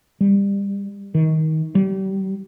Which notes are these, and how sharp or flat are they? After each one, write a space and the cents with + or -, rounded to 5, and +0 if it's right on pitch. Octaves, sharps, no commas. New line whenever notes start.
G3 +25
D#3 +20
G3 -30